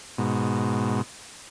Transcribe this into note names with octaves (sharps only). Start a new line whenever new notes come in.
G#2 B2